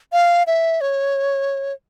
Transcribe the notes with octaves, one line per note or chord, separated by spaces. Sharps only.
F5
E5
C#5